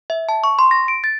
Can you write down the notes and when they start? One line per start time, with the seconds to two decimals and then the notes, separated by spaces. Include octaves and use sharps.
0.10 E5
0.29 A5
0.44 C#6
0.59 C6
0.71 A#6
0.88 D7
1.04 A6